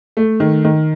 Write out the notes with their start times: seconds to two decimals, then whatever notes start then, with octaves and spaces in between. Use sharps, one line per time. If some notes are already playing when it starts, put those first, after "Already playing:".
0.17 A3
0.40 D#3
0.64 D#3